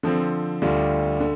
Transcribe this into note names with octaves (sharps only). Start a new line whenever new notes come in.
D3 F3 C4
D2 D3 G3 D4 F4
D3